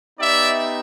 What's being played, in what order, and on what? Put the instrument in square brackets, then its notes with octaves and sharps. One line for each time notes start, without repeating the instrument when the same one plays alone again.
[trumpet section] B3 D#4 G4 D5 E5